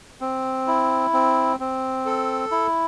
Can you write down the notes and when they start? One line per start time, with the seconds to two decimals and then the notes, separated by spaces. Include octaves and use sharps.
0.21 C4
0.67 E4
1.13 C4
1.60 C4
2.06 A4
2.51 E4